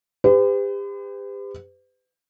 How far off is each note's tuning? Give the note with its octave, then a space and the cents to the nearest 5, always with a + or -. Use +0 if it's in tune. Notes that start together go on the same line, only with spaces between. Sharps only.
G4 +35 B4 +45